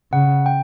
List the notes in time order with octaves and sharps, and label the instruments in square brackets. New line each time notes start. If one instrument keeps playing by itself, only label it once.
[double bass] C#3 [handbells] F#5
[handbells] G5